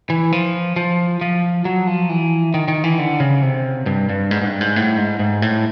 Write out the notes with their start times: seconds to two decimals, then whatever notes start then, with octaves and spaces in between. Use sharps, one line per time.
0.10 E3
0.32 F3
0.76 F3
1.21 F3
1.65 F#3
1.87 F3
2.09 E3
2.54 D#3
2.68 D#3
2.84 E3
2.99 D3
3.20 C#3
3.42 C3
3.86 G2
4.09 G2
4.31 G#2
4.42 G#2
4.46 G2
4.61 G#2
4.76 A2
4.97 G#2
5.19 G#2
5.42 A2